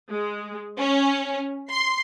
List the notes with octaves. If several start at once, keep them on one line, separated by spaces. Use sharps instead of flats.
G#3
C#4
C6